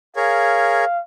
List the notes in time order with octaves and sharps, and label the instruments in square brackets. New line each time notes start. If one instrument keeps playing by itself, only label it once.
[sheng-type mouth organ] G#4 A#4 C#5 [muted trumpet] F5